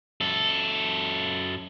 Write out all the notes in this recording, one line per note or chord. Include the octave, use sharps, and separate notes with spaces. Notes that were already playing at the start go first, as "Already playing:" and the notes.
F#2 A4